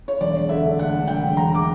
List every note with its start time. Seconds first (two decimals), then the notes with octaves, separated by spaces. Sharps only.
0.08 C#5
0.21 E1 D5
0.49 D3 E5
0.79 D2 F#5
1.07 E1 G5
1.36 E1 A#5
1.54 D6